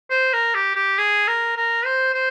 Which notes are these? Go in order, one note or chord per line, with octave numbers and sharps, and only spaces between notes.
C5
A#4
G4
G4
G#4
A#4
A#4
C5
C5